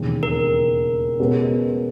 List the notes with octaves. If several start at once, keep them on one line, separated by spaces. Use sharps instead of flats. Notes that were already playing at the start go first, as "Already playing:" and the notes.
Already playing: E1 D#2 C#3
A#4
B2 G#3 C#4 F#4 B4